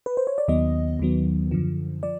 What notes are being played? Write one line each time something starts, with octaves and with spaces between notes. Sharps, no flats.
B4
C5
C#5
D5
D#2 D#3 F#3 B3 D#5
D#2 D#3 F#3 B3
F#2 D3 F3
F3 D5